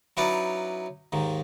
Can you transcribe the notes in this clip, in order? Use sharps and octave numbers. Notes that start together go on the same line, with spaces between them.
F#3 C#4 D#4 E4 B4 D5
D#2 G#2 D#3